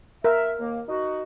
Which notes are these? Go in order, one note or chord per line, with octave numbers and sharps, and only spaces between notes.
A#4 E5
D#2 A#3
D#4 F#4